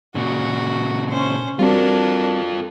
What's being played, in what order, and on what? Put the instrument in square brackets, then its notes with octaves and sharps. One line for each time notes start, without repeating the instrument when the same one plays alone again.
[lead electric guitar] A#2 C#3 [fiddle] F#4
[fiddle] C#4 C5
[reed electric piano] G3 C4 F#4 [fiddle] D4 A#4 [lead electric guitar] F4 A4